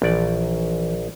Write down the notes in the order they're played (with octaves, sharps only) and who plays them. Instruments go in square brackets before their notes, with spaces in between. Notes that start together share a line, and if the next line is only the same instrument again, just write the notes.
[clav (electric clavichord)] A#1 D5 [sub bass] E3